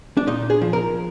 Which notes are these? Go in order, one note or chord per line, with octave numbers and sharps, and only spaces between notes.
D4
A#2 D#4
G#4
F3
A#4